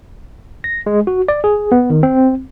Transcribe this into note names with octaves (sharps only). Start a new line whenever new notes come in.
A#6
G#3
F#4
D5
G#4
B3
D#3
C4